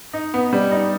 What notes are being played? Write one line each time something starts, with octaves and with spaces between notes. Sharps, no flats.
D#4
B3
G3
D#4